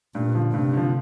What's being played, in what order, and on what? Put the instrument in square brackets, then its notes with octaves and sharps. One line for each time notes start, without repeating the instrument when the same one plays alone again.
[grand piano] G2 [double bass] A#2
[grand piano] D3 F3
[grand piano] G2 [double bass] C3
[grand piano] D3 F3